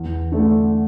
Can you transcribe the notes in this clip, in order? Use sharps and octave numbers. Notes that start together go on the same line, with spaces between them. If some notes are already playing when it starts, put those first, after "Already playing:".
Already playing: E2
D3 A3 D4 A4